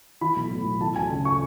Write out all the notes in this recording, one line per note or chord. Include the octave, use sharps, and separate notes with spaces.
E3 B5
B1
A2
B1
E3 A5
D2 G#5
C#3
C#6